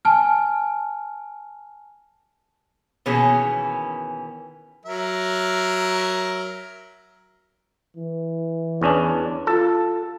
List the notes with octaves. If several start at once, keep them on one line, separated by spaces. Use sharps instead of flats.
G#5 A5 F6
B2 D#3 E3 A#3 C#4 G#4
F#3 A#4 E5
E3
E2 C#4 D4
F4 A4